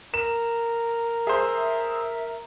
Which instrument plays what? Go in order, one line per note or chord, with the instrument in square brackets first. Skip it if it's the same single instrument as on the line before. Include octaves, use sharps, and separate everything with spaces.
[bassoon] A#4 [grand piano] E7
[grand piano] G#4 C5 [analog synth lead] E5